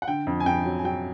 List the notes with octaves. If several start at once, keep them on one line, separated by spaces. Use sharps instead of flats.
F#5
D3 G5
F2
G#5
F2 G5
F#3
G#5
F#3 G5